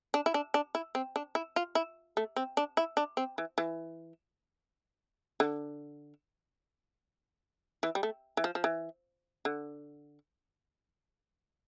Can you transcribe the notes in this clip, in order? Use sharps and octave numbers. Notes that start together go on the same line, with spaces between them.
D4
E4
D4
D4
E4
C4
D4
E4
F4
E4
A3
C4
D4
E4
D4
C4
E3
E3
D3
E3
G3
A3
E3
F3
F3
E3
D3